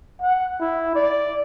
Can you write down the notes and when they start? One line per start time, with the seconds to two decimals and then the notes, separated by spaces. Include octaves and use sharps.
0.21 F#5
0.60 E4
0.95 D5